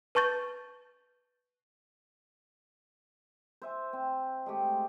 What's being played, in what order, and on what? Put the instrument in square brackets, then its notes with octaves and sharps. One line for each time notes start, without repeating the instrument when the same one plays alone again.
[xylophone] B4 A5 C#6 G6 A6
[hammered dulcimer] C5 E5 G#5
C4
G#3 A3 G4